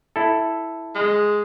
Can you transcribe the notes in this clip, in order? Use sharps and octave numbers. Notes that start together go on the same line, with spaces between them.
E4 A4
G#3